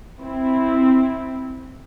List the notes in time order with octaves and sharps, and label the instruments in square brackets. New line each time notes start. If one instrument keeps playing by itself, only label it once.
[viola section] C4 E4